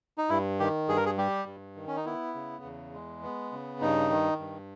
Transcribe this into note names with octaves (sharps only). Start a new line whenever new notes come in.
D#4
G2 E4
D#3 G4
G2 G#4
A#4
G#4
G3 G4
G2
D#3
C#4
D#4
B3 E4
C#3
E2
G#3
B3
C#3
G2 D#4
D#3
G2